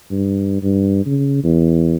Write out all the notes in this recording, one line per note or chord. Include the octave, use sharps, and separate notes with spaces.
G2
G2
C#3
E2